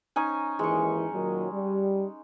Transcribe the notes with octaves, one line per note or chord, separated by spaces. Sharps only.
C#4 D#4 G#5
D#2 G#2 E3 G#3 C#6
A#2 D#3 F#3
G3